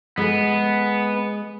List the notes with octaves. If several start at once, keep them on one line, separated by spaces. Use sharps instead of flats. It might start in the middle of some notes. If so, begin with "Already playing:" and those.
G#3 B3 G#4